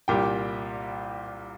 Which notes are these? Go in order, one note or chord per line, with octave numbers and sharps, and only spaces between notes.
C2 A#2 G3 G4 G5